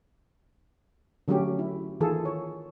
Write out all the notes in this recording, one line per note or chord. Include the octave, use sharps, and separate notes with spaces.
D3 F#3 A3 C#4 G4
E4
D#3 E3 F4 G#4 A4
C#5